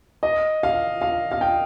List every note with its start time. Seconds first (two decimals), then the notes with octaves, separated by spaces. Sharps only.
0.23 D#5
0.63 F5
1.02 F5
1.32 F5
1.41 G5